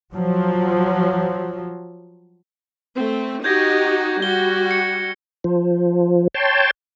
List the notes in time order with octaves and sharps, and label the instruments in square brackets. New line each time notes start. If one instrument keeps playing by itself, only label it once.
[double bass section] F3 F#3
[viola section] A3 C4
[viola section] D#4 F#4 G4 [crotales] G6 G#6 A#6
[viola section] G3 F#4 [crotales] G7
[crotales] C#7
[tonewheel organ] F3
C#5 G5 A5 C6